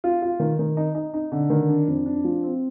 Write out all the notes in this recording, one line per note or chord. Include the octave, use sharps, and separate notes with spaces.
F4
F4
D#3
D#3
D#4
D#4
D#4
D3
D#3
D4
F2
D4
F3
C4